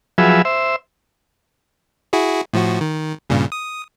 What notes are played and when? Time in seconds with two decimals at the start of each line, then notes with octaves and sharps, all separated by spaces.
0.18 F3 F#3 G#4 B4 E5
0.45 C5 E5
2.13 E4 F#4 G#4
2.53 A2 F3 F#4
2.81 D#3
3.30 G2 A#2 C#3
3.52 D#6